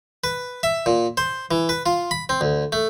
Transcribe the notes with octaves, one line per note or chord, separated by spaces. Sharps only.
B4
E5
A#2
C5
E3
B4
F4
B5
C4
D2
A3